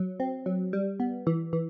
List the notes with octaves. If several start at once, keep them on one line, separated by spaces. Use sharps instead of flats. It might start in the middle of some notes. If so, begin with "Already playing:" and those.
Already playing: F#3
C4
F#3
G3
B3
E3
E3